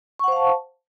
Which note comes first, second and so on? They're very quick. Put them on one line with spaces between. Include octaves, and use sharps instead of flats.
C#6 F#5 C5 F5 A5